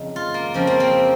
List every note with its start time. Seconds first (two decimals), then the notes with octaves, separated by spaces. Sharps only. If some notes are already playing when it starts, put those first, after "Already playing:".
Already playing: F2 C#3 D#4
0.16 F4
0.34 A#3
0.54 F2 C#3 F3 C4
0.67 A#3
0.80 C4